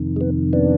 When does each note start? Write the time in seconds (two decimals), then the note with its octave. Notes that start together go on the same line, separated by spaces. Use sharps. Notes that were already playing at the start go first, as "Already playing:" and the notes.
Already playing: F2 C3 D#3
0.16 G#3
0.21 B3
0.53 B3 D4